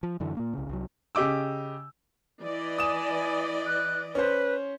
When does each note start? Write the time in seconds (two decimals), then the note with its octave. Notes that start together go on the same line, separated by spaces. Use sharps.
0.03 F3
0.20 F#2 D3 E3
0.37 A#2 A#3
0.53 C2 C#3
0.69 C2 F#3
1.15 C#3 G4 D#5 D6 E6
2.42 E3 D5 D#5
2.78 G#5 D#6 E7
3.67 F#6
4.15 C#4 B4 C5